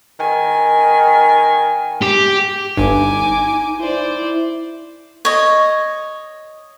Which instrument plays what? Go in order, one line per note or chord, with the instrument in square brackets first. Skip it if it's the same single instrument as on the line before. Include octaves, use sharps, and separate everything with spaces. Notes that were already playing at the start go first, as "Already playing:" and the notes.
[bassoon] D#3 [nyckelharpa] G#5
[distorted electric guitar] G4
[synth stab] G1 G2 [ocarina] D#4 [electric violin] G#5 D6
[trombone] E4 [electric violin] C5 D5
[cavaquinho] C#5 D#5